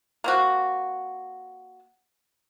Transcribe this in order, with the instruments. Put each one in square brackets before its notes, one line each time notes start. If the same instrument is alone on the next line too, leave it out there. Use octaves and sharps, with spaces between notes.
[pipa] A#3 C4 F#4